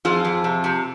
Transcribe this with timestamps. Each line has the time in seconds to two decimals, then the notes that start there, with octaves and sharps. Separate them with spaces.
0.05 F2 F4 G#4
0.25 F2
0.44 C3
0.64 C3